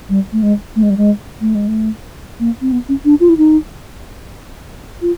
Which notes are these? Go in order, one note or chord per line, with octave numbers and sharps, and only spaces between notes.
G3
A3
G#3
A3
G#3
G3
G#3
A3
G#3
A3
A#3
C4
B3
C#4
D4
F4
E4
D#4
F4